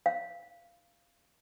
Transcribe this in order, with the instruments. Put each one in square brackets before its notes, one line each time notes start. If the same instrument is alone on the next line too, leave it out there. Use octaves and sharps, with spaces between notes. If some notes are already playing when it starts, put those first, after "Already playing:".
[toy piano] F5